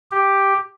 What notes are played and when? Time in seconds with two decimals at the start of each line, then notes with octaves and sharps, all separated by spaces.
0.11 G4